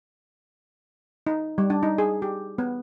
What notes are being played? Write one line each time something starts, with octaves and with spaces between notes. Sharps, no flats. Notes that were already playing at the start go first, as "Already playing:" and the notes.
D#4
G3
D4
D#4
G#4
G4
B3